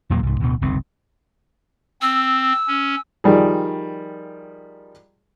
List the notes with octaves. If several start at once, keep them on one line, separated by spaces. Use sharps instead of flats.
E2 A#2 F#3 A#3
C2 G#2
D1 D2 B2
F#1 C2 D#3 C4
C4 E6
C#4
D#3 F3 G3 G#4